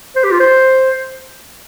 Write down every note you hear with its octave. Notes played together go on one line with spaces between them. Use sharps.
C5
G4
F4
C5